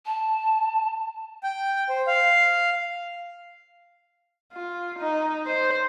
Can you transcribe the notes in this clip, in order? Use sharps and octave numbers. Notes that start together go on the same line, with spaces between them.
A5
G5
C5
F5
F4
D#4
C5